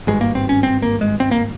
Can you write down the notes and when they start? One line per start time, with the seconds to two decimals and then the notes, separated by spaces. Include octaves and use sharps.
0.07 G#1 G2 G#3
0.21 A#3
0.35 C4
0.49 C#4
0.63 C4
0.82 A#3
1.01 G#3
1.20 C4
1.31 A#3